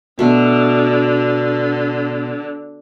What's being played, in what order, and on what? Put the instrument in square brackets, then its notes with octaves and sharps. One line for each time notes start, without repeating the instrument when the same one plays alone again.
[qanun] B2 A3 [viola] D3